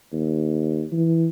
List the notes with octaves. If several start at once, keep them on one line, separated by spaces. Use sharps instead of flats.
D#2
E3